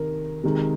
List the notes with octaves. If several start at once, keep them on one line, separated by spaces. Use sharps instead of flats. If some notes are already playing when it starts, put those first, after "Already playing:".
Already playing: C3 D#3 A#4
C3 D#3 G#3